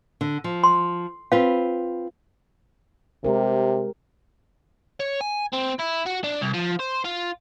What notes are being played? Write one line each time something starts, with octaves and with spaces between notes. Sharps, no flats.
D3
F3
C6
C4 F4 B4 F5
C3 G#3 G4 A#4
C#5
G#5
C4
E4
F#4
D4
C2
F3
C5
F4